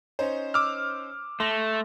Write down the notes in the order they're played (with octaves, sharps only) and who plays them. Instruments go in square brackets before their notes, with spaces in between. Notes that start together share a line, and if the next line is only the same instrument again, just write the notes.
[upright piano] C#4 D#4 C5
[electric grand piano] D6 E6 F6
[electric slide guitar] A3 [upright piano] C6 A#6